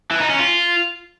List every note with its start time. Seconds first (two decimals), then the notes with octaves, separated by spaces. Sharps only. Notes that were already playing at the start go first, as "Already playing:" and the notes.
0.11 E3
0.20 D#4
0.30 C#4
0.39 F4